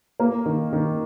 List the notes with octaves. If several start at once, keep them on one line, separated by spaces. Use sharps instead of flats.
A#3
D#3
D#3